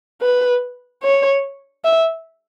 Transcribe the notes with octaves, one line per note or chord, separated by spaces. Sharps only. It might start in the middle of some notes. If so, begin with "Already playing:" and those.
B4
C#5
E5